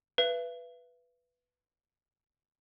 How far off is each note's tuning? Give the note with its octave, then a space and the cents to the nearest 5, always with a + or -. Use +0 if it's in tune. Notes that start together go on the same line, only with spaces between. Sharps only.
B4 +0 E5 +40